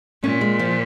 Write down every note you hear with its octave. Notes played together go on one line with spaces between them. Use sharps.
A#2 C#4
G#3
F3